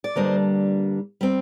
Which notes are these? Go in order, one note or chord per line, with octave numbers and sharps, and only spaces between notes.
D5
G2 D3 G3 A#3 D4 C5 D#5
G3 C4